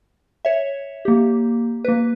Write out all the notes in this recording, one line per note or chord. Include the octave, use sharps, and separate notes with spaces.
C#5 E5
A#3 G4
A#3 B4